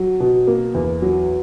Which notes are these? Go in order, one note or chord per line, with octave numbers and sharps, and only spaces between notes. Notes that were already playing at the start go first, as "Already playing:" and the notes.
Already playing: F#3
B2
A#3
E2
F#3